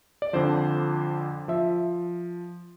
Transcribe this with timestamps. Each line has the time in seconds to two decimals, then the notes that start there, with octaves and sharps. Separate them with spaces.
0.22 D5
0.33 F2 D3 F3 C5
1.48 F3 E5